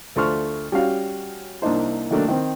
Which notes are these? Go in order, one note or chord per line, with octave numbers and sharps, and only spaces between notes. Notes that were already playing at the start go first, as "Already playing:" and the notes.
D2 A3 F4 C5 C#6 F6
G3 C#4 F#4 F5
C2 A#3 D4 D#4 C5
D#3 F#3 A3 A#3 D4
D#3 C4